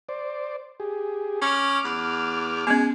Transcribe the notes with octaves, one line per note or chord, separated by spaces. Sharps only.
C5 D5
G4 G#4
C#4 D6 F6
E2
G#3 B3 C#4